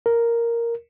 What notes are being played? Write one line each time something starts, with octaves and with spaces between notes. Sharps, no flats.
A#4